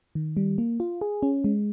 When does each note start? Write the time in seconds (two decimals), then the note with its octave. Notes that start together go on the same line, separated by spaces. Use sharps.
0.15 D#3
0.37 G3
0.58 A#3
0.80 F4
1.01 G#4
1.23 C#4
1.44 G#3